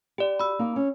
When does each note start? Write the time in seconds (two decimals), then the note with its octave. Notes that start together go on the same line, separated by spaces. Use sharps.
0.18 G4 D5 G5
0.39 F#4 B5 E6
0.59 A#3 D#4
0.76 C#4